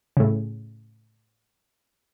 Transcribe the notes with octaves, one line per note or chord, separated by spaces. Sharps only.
A2 C#3